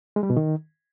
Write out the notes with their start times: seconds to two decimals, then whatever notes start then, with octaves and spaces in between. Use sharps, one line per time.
0.16 G#3
0.23 G3
0.30 B2
0.37 D#3